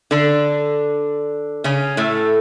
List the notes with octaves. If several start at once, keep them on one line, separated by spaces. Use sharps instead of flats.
D3 D4
C#3 C#4
A2 A3